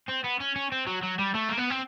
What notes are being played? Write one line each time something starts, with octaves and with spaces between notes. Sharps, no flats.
C4
B3
C#4
C#4
C4
F#3
F#3
G3
A3
A#3
B3
C4